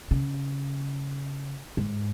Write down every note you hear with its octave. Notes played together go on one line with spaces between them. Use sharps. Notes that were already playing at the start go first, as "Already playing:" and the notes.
C#3
G#2